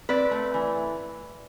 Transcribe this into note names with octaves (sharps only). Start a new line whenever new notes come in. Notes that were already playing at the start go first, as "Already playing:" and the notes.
C4 B4 D5
A3
E3